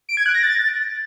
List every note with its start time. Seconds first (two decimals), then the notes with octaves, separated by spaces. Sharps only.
0.09 D7
0.17 G#6
0.26 F#6
0.34 A#6
0.43 A6